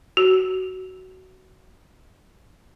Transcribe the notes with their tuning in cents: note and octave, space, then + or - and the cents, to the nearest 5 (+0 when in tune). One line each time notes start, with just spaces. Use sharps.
F#4 +15